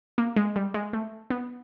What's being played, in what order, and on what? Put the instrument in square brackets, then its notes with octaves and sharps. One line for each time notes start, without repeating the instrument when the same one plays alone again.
[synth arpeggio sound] A#3
G#3
G3
G#3
A3
B3